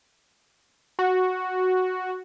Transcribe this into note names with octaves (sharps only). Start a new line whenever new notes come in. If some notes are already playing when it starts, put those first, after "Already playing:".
F#4